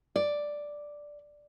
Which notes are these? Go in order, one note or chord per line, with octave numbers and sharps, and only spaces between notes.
D5